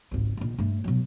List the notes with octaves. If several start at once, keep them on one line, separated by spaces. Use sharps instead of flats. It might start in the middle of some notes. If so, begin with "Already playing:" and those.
G#1 C#2
A#1 D#3
G2 A3
B2 F#3